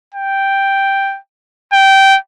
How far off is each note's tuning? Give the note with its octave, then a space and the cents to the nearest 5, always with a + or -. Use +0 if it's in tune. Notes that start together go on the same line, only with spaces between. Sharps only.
G5 +0
G5 -15